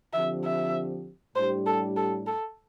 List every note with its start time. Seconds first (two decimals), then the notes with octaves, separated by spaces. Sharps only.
0.13 D3 F3 C4 G4 E5
0.45 E5
1.35 A2 G3 D4 G4 C5
1.66 A4
1.97 A4
2.27 A4